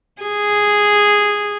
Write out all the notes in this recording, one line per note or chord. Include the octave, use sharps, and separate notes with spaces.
G#4